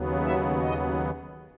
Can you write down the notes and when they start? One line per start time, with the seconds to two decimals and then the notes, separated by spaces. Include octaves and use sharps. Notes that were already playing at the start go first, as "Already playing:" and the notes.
Already playing: D#2 C#3 F#3 B3
0.23 E5
0.62 D#5